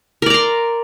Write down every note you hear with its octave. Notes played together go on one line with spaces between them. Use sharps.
A#4 D5 A#5 C6